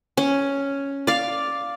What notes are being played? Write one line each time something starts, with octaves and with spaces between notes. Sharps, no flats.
C#4
D5 F5